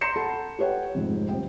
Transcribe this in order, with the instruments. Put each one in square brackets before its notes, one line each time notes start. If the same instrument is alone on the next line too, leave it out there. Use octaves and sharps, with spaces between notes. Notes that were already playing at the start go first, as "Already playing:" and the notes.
[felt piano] A#5 C6 G6 C7 C#7 E7
A4 F#5 A5 B5
G4 B4 C#5 F#5 G5
F1 F2 G#2
D#1 C4 G5